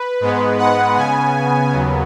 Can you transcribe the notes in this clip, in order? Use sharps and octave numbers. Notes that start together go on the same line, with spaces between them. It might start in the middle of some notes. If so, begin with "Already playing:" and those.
Already playing: B4
G#2 G#3 B3
F#5
C#3 B3 G#5
D#2 C#3 F#3 B3